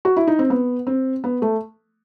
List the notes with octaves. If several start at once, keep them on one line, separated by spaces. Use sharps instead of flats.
F#4
E4
D#4
C4
B3
C4
B3
A3